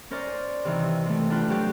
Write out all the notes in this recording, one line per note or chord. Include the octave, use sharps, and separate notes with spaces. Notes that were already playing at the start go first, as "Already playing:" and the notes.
C#4 A#4 C5 D5
C3 D#3 E3
C3 A3
D4 F4 B4 C5 G5
F#3 G4 C5 G6